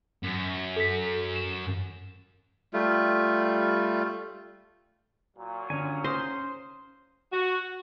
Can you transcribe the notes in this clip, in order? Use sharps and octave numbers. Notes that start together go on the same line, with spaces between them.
F#2
A4 B6
E7
G3 A3 F4
A#2 F#3
D3 C#4 D4 G#5
C5 A#5 C6 D#6
F#4